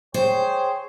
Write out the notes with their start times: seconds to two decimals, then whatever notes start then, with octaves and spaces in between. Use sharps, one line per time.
0.14 G#4 C5 C#5 G5